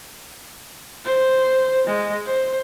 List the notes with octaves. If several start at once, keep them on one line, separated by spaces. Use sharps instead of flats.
C5
G#3
C5